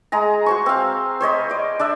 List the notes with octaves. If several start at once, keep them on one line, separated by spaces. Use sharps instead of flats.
G#3 G#4 A#5
F#4 C5 C#6
C4 F5
C5 C#5 D#5 B5
D5 D#5
D4 D5 E5